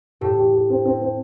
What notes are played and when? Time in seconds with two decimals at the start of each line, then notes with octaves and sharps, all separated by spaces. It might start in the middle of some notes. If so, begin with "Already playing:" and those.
0.21 A2 G4
0.37 G4
0.54 G4
0.70 C4
0.85 C4
1.02 C4